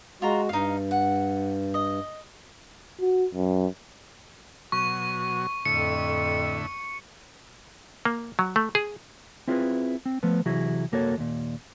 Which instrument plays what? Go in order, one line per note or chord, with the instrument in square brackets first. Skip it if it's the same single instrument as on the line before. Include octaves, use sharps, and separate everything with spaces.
[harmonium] G#3 F#4 [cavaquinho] F4 A#5
[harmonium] G2 [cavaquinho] D#4 F5
[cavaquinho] F#5
D#5
[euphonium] F#4
F#2
[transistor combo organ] B2 F#3 [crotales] C#6
[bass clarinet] F2 [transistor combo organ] A2 D3 E5 [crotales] C#7
[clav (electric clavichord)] A#3
F#3
A3
G#4
[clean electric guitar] C4 E4 F4 G#4 A#4 B4
C4
F3 A3 B3
C3 E3 F#3 E4 F#4 G#4
C2 F#2 A#3 F#4 A4 C#5
D#2 A#2